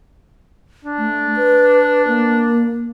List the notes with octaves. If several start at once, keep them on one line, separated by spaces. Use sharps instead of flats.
D4
A3
B4
A#3